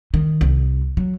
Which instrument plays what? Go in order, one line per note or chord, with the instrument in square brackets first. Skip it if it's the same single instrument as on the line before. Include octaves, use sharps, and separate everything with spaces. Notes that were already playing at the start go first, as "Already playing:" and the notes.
[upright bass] D#3
C2
F#3